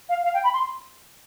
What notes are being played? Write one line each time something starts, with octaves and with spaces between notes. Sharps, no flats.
F5
F5
G5
B5
C6